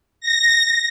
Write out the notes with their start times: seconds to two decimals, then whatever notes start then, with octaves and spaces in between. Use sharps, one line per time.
0.20 A#6